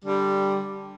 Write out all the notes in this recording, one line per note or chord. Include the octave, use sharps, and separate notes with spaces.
D3 G3